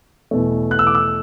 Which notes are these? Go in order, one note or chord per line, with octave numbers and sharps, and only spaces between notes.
E2 B2 A3
F#6
E6
D6
E6